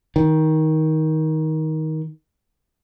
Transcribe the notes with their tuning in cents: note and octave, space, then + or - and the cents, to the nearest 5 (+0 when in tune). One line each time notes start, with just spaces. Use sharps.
D#3 +15